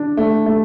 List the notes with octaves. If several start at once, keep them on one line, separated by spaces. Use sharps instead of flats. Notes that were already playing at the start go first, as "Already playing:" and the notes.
Already playing: D4
A3
A3